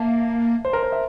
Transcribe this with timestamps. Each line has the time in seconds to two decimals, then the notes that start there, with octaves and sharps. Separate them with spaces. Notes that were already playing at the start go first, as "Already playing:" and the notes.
Already playing: A#3 E5 A5
0.65 C5
0.73 A#4
0.83 C5
0.92 E5